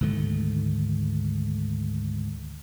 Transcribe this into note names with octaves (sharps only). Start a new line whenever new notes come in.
D2 G#2 D#3 A3